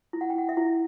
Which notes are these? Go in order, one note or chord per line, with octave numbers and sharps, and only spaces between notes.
E4
F#5
G5
E4 F#5
E5
E4